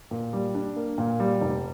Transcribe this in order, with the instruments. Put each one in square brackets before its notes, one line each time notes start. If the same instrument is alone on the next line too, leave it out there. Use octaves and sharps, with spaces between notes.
[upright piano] A#2
G3
D4
A#3
A#2
G3
F1